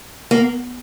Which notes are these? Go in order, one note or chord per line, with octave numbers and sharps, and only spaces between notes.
A#3